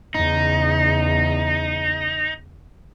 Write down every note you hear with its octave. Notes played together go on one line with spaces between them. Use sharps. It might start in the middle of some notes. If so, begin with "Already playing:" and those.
E2 C#3 D#4